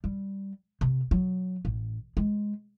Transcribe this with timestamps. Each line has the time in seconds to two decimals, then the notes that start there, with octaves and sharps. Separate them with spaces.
0.04 G3
0.81 C3
1.11 F#3
1.65 A1
2.17 G#3